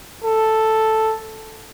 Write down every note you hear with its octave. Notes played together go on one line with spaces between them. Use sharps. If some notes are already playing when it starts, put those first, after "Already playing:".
A4